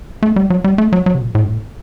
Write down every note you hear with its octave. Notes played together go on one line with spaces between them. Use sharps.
A3
G3
F#3
G3
A3
F#3
F#3
C3
A#2
A2
G2
A2